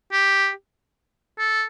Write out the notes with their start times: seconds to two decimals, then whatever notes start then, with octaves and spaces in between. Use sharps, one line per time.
0.12 G4
1.38 A4